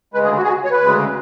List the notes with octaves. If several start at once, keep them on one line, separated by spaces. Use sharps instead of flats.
D2 C#3 G#3 B4
G#4
F#4
G#4
F#4
C#5
B4
D2 C#3 G#3